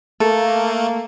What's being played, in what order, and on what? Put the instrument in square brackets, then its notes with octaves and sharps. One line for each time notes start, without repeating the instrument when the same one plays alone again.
[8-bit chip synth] A3 [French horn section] A#3 [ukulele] A4